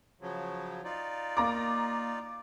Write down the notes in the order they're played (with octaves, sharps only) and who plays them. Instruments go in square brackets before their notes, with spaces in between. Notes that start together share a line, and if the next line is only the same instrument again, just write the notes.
[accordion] C#3 F3 F#3
D#4 F4 D5
[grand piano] A#3 A#5 D6